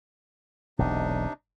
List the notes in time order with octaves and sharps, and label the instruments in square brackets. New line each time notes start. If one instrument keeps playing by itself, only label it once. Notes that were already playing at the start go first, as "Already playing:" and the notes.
[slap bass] E1 B1 [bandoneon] C3 D4 D#4